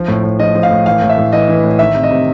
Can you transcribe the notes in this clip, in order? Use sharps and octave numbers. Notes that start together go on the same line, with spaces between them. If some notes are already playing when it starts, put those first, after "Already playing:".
Already playing: F3
A2
A2
F3 D#5
F3
F5
A2
E3 F5
A2
E5
A2
E3 D#5
E3
A2
D#3 E5
C3
D#5
C3